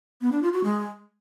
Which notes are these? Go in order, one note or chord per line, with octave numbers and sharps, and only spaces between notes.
B3
D4
F4
F#4
G#3